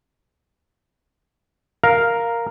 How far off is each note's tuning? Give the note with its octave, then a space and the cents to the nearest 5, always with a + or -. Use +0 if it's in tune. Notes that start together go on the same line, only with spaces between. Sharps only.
A#4 +0 F5 +0